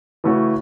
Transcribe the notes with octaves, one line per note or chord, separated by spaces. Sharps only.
C#3 E3 A3 C#4 F#4